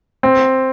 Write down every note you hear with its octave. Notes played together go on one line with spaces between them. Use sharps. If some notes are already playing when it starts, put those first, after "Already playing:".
C4